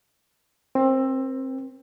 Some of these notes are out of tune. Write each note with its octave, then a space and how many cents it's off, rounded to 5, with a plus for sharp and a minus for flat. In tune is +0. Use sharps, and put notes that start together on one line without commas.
C4 +20 B4 -45